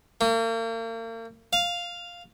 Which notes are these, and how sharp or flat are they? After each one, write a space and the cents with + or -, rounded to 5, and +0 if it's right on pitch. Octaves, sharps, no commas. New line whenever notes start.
A#3 -40
F5 +0